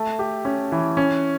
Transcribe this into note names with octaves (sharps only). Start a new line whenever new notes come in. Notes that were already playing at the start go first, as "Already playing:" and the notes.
Already playing: A3
G4
C#4
E3
C#4